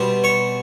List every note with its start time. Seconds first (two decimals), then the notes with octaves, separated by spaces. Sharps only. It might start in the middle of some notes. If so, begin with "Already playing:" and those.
Already playing: B2 G3 C4
0.24 C#5